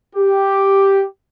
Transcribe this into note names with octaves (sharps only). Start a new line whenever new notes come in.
G4